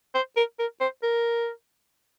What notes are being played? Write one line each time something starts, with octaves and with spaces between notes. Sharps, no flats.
C5
A#4
A#4
C5
A#4